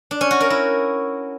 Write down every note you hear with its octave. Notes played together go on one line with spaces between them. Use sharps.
D4
C#4
F#4
A#4
E4